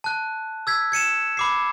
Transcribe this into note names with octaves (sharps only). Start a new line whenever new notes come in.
A5 F#6
E6 G#6 B6
G#6 C#7 D#7 E7
B5 D6 C7